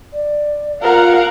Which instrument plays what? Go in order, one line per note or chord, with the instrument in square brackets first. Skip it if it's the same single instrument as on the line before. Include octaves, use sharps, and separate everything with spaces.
[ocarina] D5
[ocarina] F4 [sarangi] A#4 [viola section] F5 F#5